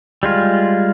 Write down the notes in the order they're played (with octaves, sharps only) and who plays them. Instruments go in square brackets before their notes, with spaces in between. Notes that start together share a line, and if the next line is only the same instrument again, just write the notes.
[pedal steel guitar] G3 G#3 F4